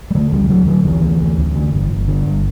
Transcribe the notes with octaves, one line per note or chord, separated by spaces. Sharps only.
G3
D3 A3
D2 G3
G3
D3 F#3
D3 F#3
D2 E3
D2
D2
D2
D3
G1
G1
D3
G1